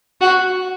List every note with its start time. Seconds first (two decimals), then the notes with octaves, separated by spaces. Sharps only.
0.21 F#4